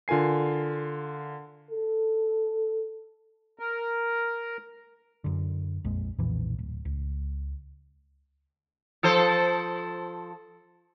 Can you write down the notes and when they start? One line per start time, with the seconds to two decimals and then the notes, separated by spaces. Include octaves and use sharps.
0.08 D3 F4 A#4 G#5 C7
1.71 A4
3.59 A#4
5.24 F#2 D3
5.84 A#1 F2 G#3
6.18 B1 F2 A#2 E3
6.58 D1
6.85 C#2
9.03 F3 A4 C5